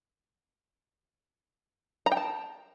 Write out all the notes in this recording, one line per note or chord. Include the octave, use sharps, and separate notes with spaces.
A#5
G5
A5